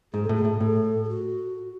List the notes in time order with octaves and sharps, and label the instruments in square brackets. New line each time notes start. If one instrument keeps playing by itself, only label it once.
[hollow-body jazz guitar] G#2 [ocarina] G#4
[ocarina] A4
[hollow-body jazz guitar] A2
[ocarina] G#4
[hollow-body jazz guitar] A2
[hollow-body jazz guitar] A2 [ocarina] A4
[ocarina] G#4
F#4